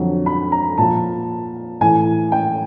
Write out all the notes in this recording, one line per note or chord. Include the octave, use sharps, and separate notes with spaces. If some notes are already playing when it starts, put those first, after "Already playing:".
Already playing: F2 D3 F#3
B5
A#5
A#2 F3 A5
A2 E3 G#5
G5